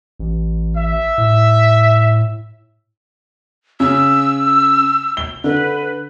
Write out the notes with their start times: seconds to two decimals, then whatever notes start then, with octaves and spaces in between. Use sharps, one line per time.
0.19 A1
0.77 E5
1.18 A2
3.80 C#3 E6
5.17 G7
5.44 D3 B4